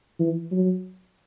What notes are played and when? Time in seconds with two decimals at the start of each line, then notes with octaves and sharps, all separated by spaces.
0.19 E3
0.52 F#3